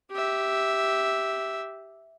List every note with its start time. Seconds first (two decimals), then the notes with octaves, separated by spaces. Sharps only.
0.12 G4 E5